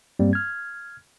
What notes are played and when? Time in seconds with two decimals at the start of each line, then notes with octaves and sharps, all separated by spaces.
0.19 G2 G3 A#3 C4
0.33 F6 G#6